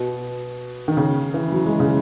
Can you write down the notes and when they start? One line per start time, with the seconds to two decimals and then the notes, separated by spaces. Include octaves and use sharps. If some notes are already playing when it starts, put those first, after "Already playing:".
Already playing: B2
0.88 D#3
0.97 C#3
1.34 E3
1.52 F#3
1.66 G#3
1.80 C#3